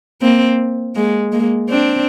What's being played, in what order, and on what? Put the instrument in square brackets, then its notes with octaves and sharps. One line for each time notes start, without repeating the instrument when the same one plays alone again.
[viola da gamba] A#3 C4
G#3 A#3
G#3 A#3
C4 D4